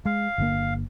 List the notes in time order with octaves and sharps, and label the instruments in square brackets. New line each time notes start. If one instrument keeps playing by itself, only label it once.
[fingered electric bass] G#3 [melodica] F5
[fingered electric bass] G1 D3 A#3